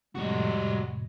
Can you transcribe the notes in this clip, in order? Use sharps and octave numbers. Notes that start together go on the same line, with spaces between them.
F2 A2 C3 G3 G#3 F#4